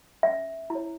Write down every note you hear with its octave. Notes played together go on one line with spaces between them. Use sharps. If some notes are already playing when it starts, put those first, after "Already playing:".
C#4 E5
E4
C#5